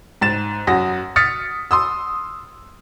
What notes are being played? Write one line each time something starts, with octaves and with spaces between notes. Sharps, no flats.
G#2 A6 E7
F#2 F#4 D#6 A#6
D#6 F6 A6 B6 C#7
C6 D#6 E6